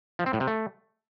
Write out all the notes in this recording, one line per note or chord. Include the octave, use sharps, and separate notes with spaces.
F3
C4
A2
C3
A3